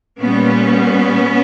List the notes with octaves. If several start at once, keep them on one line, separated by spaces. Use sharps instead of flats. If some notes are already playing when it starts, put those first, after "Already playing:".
A#2 G3 B3 C#4